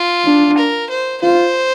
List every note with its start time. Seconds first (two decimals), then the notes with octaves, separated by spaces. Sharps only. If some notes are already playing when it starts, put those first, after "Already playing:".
Already playing: F4
0.25 D4
0.58 A#4
0.90 C5
1.22 F4 C5